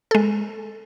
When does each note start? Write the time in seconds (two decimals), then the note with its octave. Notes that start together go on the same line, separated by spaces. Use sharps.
0.11 G#3 A4